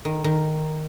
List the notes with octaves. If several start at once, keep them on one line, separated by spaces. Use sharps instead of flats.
D#3
D#3